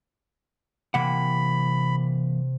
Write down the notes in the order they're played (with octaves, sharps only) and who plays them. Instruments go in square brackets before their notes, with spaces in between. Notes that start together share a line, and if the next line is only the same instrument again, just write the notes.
[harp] C3 [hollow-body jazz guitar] E3 A#3 F#5 [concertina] B5